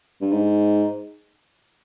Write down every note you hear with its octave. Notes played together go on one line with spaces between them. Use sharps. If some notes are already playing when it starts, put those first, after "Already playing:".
G2
G#2